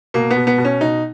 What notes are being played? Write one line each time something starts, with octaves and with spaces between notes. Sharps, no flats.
B2 A#3
B3
B2
B3
B2
C#4
B2 D#4